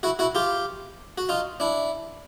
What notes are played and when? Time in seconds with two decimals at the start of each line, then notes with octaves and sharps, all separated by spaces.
0.03 E4 F#4
0.19 E4 F#4
0.35 F4 G4
1.18 F#4
1.29 D#4 F4
1.60 D4 E4